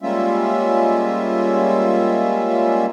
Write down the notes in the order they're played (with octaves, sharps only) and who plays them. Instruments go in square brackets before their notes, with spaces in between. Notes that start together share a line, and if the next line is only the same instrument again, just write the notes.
[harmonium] G3 G#3 A#3 C#4 F4 E5